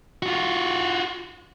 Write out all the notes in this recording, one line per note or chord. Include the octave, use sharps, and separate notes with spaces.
F4 F#4